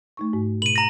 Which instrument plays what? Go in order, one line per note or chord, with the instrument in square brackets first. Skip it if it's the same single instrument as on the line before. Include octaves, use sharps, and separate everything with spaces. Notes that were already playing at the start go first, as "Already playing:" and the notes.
[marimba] A3 D#4 C#6
G#2
[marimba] B2 [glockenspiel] D#7 F#7
[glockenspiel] A#5 A#6